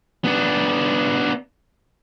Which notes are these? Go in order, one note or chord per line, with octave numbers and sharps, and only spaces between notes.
B3 D4